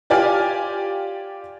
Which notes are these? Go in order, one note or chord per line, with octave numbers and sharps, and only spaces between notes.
F4 G4 D5 G5 G#5 F6